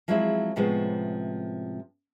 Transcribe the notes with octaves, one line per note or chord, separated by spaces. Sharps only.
F3 F#3 G#3 C4 E4
A2 C3 F3 G#3 B3 C#4